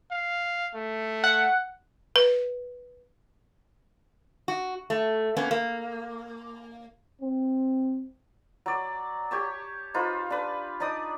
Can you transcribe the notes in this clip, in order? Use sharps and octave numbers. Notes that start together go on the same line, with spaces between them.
F5
A3
F#5
B4
F#4
A3
A#3 B3 C#4
A#3
C4
F#3 D5
G4 C#5 A5
D#4 F4 B4 C5
D4 B4
D4 D#4 D5 D#6